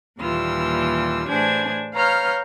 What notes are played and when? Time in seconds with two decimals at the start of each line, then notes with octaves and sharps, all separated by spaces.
0.20 D#2 A#2 E3 G3 F4 E6
1.28 A2 E3 D4 G#4 C5 G#6
1.95 B4 C#5 F5 A#5 F6 G6